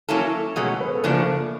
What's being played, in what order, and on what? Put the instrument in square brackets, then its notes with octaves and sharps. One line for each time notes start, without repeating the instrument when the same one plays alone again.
[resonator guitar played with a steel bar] F#3 A#3 C#4 E4 A4
[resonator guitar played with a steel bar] B2 F#3 A3 C#4 [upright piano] G#3 G#4
[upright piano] B3 B4
A4
[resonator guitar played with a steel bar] F#2 C#3 F3 A3 D4 [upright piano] A#3 A#4